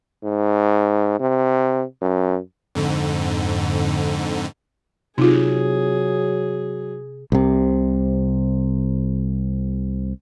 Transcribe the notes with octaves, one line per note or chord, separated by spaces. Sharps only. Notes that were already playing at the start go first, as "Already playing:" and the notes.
G#2
C3
F#2
F2 G#2 D3
C3 F#3 D#4 F4 G#4
C2 C3